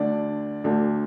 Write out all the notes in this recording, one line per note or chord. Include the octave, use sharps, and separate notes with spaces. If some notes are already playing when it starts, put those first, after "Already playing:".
Already playing: D2 D3 A3 D4 D5
D2 D3 A3 D4